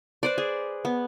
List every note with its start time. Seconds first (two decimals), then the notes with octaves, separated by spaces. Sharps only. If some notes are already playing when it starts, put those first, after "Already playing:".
0.23 B4 C5 D5
0.38 G#4
0.85 B3